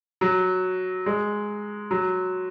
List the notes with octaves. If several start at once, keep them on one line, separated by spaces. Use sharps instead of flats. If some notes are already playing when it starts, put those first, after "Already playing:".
F#3
G#3
F#3